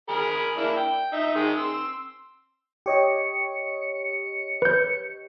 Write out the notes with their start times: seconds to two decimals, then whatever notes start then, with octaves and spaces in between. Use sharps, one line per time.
0.09 G#4 A#4 B5
0.57 A#3 D4 E4
0.76 G5
1.13 D#4 E5
1.36 D#3 G#3
1.57 C6 E6
2.86 G4 C#5 D#5 C#7
4.62 B4 G6